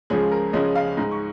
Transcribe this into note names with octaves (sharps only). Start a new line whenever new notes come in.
C#2 C#3 F3 G#3 C#4 G#4
A#4
C#2 C#3 F3 G#3 C#4 D#5
F5
G#2 G#3 D#4
C#6